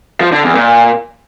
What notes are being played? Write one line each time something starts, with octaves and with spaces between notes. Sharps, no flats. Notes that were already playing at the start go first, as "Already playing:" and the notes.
F3
D3
E2
A#2